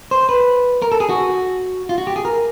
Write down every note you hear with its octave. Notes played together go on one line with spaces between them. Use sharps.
C5
B4
A#4
A4
G#4
F#4
F4
F#4
G4
G#4
A#4